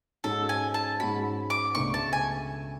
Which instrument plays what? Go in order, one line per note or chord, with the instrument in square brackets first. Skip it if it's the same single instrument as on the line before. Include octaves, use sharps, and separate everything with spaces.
[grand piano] G#2 G#3 C#4 F#4 [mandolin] A4
[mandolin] G#5
A5
[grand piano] G#2 G#3 C#4 F#4 [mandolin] B5
[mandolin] D6
[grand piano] C#2 B2 A3 D4 [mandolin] C#6
[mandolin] A5
G#5